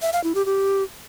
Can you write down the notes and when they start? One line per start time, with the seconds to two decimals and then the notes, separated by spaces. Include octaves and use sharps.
0.02 E5
0.13 F5
0.24 E4
0.35 G4
0.46 G4